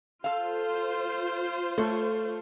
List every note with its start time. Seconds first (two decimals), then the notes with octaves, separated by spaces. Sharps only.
0.24 F4 A4 C5 F5
1.78 A3 A4 C#5